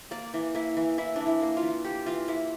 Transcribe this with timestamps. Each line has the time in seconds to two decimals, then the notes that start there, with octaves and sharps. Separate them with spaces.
0.11 A#3 D5
0.34 E3
0.55 A#3 E4
0.77 E3
0.98 A#3 E4
1.16 E3 D4
1.27 E4
1.42 A#3
1.57 F4
1.63 E3
1.84 A#3 G4
2.06 E3 F4
2.28 A#3 E4